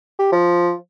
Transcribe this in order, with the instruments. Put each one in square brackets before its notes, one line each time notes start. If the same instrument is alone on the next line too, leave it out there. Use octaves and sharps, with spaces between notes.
[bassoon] G4
F3